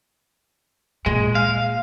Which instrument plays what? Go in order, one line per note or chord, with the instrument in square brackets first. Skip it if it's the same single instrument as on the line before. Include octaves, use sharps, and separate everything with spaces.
[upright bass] A#2 [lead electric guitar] G#3
[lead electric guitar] F5